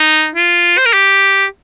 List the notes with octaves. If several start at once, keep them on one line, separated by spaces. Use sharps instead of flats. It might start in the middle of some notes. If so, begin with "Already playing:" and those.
Already playing: D#4
F4
C5
A#4
G4